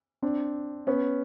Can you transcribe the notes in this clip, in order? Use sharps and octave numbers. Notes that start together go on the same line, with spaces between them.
C4 D4
B3 C#4